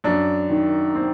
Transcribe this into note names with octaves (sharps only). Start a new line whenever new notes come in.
F#2 D4
D#3
C4